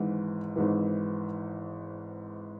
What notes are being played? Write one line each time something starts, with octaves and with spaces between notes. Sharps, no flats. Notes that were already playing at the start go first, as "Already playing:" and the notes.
Already playing: G#1 G#2 E3
G#1 G#2 E3